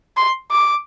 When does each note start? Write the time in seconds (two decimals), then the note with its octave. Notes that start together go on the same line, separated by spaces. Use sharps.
0.17 C6
0.51 D6